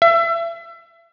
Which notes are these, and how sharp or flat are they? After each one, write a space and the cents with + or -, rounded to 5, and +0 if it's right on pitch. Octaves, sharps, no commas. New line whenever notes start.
E5 +35